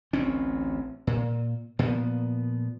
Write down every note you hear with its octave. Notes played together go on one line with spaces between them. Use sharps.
A1 D2 C4 C#4
A#2
A#2 F3 B3